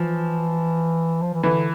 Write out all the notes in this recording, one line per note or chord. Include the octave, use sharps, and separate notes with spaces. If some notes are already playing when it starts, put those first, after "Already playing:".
Already playing: E3 F3
F3
E3
D3 E3